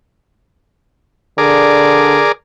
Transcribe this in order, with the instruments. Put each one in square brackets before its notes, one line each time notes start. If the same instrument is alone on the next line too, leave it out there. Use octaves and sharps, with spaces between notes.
[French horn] D3 [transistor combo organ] G#4 A#4 D5